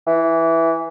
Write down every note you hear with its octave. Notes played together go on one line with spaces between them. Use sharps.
E3